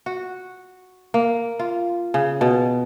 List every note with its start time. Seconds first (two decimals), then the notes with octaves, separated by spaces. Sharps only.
0.06 F#4
1.14 A#3
1.59 F4
2.14 C#3
2.41 B2